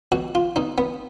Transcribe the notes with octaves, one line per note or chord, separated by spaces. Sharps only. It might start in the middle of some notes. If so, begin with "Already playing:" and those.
B2 F#4
F4
B2 D#4
B3